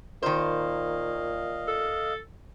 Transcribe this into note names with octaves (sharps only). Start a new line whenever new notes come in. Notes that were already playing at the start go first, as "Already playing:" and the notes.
A#2 D#3 C5 D#5 F5
A4